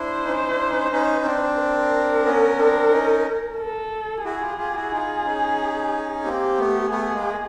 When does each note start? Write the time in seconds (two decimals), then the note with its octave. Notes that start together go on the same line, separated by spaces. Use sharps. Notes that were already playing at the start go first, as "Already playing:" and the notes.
Already playing: D4 E4 C5
0.25 C#4 D#4
0.47 D4 E4
0.69 C#4 D#4
0.92 C#4 D#4
1.25 C4 D4
1.58 A#4
2.25 B3 C#4
2.58 C4 D4
2.91 C#4 D#4
3.58 A4
4.24 E4 F#4 G#4
4.41 F4 G4
4.58 F4 G4
4.74 E4 F#4
4.91 D#4 F4
5.24 C#4 D#4
6.24 A#3 C4 G4
6.58 A3 B3
6.90 A3 B3 G#4
7.13 G#3 A#3